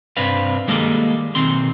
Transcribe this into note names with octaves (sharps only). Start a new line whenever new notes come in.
G2 C3 C4 D4 B4 F5
D#3 G3 G#3 A#3 A4
B1 D#3 C4 C6